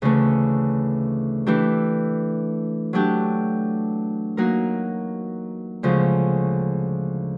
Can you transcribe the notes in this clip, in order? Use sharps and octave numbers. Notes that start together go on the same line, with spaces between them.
D2 C#3 E3 A3
E3 A3 D4 G4
F#3 A3 D4 G4
F#3 A#3 D#4 F#4 A#4
D2 C#3 F3 G#3